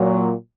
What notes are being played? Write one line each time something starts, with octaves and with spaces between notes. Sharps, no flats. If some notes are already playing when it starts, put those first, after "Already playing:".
Already playing: A#2 F#3